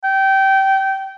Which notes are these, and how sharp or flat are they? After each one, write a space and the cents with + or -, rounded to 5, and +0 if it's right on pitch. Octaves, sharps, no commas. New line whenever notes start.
G5 -20